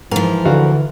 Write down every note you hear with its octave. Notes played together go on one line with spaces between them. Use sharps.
G#2 E3 F3 A#4
D2 D3 F#4 F5